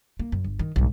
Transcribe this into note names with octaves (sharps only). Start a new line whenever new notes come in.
A#3
F#2
G1
D#3
B1 G#2